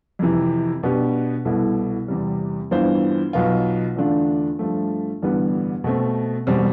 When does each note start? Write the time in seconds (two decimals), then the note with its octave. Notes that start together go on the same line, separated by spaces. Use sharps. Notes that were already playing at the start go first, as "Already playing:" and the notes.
0.19 F2 C3 E3
0.83 B2 B3 D4 G4
1.45 C2 B2 B3 E4 A4
2.08 E2 C3 G3
2.71 G2 E3 B3 F4 C5
3.33 B1 B2 B3 F4
3.96 E2 D3 A3 D4 F4
4.59 G2 F3 A3
5.22 A1 G2 D3 G3 B3
5.84 B2 A3 C4
6.47 E1 B2 G3 C4